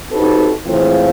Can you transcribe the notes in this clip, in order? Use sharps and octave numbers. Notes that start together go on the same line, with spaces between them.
C4 D#4 F#4 G4 A4 B4
A2 E3 F3 G#3 C4 F4